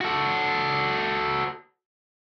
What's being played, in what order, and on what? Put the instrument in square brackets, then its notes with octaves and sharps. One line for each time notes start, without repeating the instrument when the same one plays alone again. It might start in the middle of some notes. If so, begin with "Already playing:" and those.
[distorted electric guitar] F#4 A4